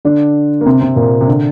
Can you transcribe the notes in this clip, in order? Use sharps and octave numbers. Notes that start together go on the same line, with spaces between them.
D3 D4
A#3
C3 C4
C3 C4
A#2 A#3
C3
D3